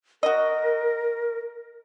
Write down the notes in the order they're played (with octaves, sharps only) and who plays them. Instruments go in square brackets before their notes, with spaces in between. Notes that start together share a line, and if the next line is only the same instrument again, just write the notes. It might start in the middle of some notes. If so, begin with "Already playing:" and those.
[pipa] F#4 D#5 [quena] A#4